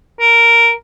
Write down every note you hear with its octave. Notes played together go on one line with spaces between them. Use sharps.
A#4